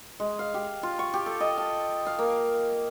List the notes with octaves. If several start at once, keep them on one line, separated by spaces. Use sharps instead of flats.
G#3
F5
G4
F4
C#6
G4
A4
D#5
A5
F5
A#3